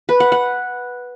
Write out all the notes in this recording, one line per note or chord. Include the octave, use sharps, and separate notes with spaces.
B4
F#5
F#5